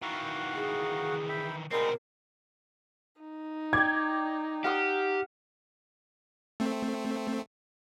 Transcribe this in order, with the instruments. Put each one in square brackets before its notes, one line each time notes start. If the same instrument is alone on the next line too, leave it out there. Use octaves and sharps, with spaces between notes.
[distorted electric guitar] D#3 E3 [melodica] F#4 F5 F#5
[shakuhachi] G#4
[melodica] E5 G5 B5
[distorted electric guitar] B2 C4 [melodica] G3 G#3 D#4 [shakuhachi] A#4
[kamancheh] D#4
[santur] D5 G5 [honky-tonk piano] G#6
[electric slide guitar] G4 [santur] F5 F#5 D#6
[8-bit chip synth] A3 C4